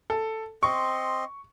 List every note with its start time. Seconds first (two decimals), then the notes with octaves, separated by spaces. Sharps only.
0.10 A4
0.63 C4 D#5 C6 C#6